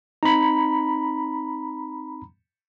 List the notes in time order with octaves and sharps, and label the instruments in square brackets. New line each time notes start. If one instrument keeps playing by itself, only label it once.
[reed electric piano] C4 D#4 [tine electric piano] A#5 B5